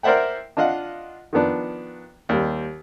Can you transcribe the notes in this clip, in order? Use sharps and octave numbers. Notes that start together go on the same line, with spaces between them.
A#4 C5 D5 E5 F#5 G5
D4 F4 D#5 F5 F#5
D#3 F3 B3 D4
D#2 G3